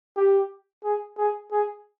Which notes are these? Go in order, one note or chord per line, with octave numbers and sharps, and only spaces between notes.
G4
G#4
G#4
G#4